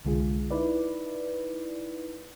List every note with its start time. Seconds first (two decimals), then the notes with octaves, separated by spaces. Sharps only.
0.05 C2 D3 G#3 F4 G#4
0.51 D#4 E4 B4 D5